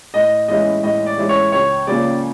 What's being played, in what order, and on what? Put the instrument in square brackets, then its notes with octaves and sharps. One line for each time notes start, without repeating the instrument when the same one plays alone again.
[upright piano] A2 [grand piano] D#5
[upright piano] E3 G#3 C#4 E4 [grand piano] D#5
[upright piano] A2 [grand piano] D#5
[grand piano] D5
[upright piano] E3 G#3 C#4 E4
[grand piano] C#5
[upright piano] C#2 [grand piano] C#5
[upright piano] C#3 F3 A#3 C#4 [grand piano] D5